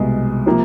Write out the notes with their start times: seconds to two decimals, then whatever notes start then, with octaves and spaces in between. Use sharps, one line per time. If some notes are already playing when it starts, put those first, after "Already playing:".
Already playing: C2 B2 G#3
0.46 C3 F3 A#3